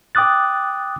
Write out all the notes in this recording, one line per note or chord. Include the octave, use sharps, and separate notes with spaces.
G5 D6 D#6 F#6 A6